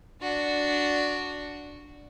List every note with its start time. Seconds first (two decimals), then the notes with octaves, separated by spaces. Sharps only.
0.22 D4 F#4